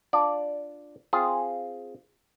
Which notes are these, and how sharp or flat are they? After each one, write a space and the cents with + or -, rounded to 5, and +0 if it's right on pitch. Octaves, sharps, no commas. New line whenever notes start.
D4 +0 F4 +5 D5 +0
C4 +0 F4 +0 G#4 +0